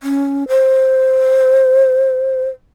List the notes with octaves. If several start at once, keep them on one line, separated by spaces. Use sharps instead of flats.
C#4
C5